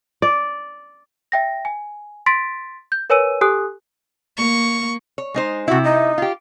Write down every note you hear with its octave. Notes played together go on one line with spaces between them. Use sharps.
D5
E5 G5 A#6
G#5
C6 A6 B6 D7
G6
A#4 B4 C#5 G#5 E6 D#7
G4 A4 G#5 D#6 F#6
A#3 C#6
C#5
G#3 D#4 C5
C3 E4 F#4
D#4
F4 G4